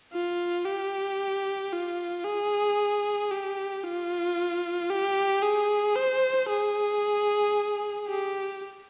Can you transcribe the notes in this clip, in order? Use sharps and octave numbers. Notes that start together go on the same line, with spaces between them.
F4
G4
F4
G#4
G4
F4
G4
G#4
C5
G#4
G4